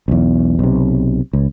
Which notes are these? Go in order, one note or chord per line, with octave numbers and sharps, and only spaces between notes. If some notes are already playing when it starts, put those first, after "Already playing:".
B1 E2
B1 C3
C#2